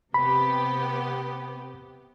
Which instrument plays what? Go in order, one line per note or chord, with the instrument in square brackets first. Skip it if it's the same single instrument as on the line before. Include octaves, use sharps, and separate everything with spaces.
[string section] C3 B3 G4 [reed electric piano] B5